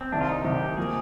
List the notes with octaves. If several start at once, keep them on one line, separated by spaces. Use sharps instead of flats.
C4
C2 C3 D#3 D4
F4
D#4
C2 C3 D#3 G4
F3 A#3 G#4